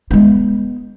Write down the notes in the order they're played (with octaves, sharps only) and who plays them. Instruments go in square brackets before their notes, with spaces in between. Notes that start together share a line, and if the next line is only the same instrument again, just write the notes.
[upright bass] G#3 B3